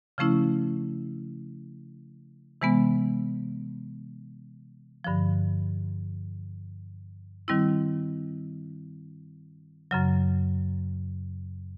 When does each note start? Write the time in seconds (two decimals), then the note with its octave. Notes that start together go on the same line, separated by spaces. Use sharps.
0.18 C#3 F3 A3 C#4 E4
2.61 C3 E3 G#3 B3
5.04 G2 D3 F3
7.48 D#3 G3 C4 E4
9.91 F#2 C#3 F#3